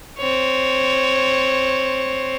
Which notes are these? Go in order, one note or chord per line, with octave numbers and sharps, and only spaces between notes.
C4 C#5